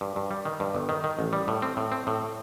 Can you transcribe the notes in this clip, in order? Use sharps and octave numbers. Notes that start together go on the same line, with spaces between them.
G2
G2
G3
D#3
G2
G1
D#3
D#3
A1
G3
A2
C4
A2
C4
A2